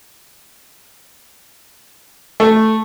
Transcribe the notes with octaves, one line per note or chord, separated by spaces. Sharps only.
A3